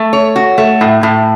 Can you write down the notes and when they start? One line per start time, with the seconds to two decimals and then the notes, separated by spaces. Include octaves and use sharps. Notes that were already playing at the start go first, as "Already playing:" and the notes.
Already playing: A3
0.13 C#5
0.36 F#4
0.58 A3
0.81 A2
1.03 A2